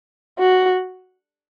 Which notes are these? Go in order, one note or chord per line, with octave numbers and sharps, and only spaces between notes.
F#4